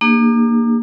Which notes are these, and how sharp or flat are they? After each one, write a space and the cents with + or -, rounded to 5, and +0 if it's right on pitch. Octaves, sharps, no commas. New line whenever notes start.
A#3 -5 D4 +40 G#4 -40